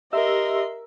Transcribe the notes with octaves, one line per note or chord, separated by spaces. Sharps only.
G4 A#4 D#5 E5 C6 E6